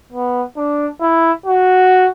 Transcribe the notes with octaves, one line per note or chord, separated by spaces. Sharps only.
B3
D4
E4
F#4